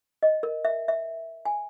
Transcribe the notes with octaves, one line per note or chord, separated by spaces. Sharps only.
D#5
A#4
E5
E5
G#5